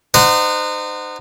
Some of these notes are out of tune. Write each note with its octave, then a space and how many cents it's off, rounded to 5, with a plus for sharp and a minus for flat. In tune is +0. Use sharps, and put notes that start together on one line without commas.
D#4 -30 C5 -25 F#5 +0